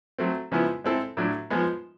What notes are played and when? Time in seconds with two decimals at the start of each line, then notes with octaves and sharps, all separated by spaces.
0.18 F#3 A3 C4
0.52 C#3 F3 G#3 B3 E4
0.84 G#3 C4 E4 A4
1.17 A2 F#3 A3 D4
1.50 F3 G#3 B3